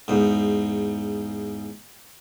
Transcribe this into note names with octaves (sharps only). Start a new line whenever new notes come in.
E2 G#2